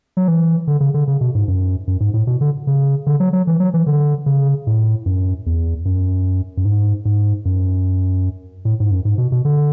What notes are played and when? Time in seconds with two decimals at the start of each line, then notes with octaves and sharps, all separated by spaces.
0.17 F#3
0.28 E3
0.67 D3
0.80 C#3
0.94 D3
1.07 C#3
1.21 B2
1.35 G#2
1.48 F#2
1.87 F#2
2.00 G#2
2.14 A2
2.27 B2
2.41 D3
2.67 C#3
3.07 D3
3.20 F#3
3.33 F#3
3.47 E3
3.60 F#3
3.74 E3
3.86 D3
4.26 C#3
4.67 A2
5.06 F#2
5.46 E2
5.85 F#2
6.57 F#2
6.65 G#2
7.05 G#2
7.45 F#2
8.65 A2
8.80 G#2
8.91 F#2
9.05 G#2
9.18 B2
9.32 B2
9.45 D3